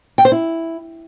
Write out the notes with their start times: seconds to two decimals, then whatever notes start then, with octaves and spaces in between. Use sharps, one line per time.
0.18 G5
0.25 C5
0.32 E4